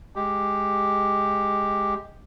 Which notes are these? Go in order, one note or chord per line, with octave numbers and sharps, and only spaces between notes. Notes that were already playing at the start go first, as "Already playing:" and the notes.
G#3 G4